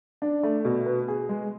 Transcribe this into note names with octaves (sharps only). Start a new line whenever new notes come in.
D4
A3
B2
B4
G#4
G#3